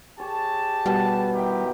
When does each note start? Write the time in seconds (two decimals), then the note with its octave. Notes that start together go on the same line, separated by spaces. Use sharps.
0.19 G4 G#4 C#5 A5
0.86 B2 G3
1.33 D#3 E4 G4